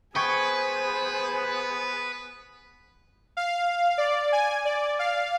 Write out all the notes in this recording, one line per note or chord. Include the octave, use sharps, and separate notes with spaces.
B3 G#4 B4 C5 G5 C#6 G#6
F5
D5
G#5
D5
F5